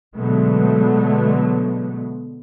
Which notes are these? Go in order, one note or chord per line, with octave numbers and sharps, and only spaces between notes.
B2 D3 F#3 G#3 A3 B3